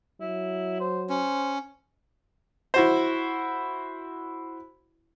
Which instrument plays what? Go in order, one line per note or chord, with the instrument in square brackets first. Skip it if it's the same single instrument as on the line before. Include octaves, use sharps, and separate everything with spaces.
[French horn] F#3 [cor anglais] E4
[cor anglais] C5
[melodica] C#4 [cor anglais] C5
[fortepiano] E4 F#4 C5